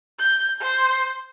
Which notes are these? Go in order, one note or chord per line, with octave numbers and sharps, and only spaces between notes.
G6
C5